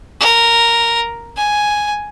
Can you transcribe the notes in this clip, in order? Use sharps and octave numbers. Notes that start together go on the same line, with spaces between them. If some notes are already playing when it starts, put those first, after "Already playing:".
A#4
G#5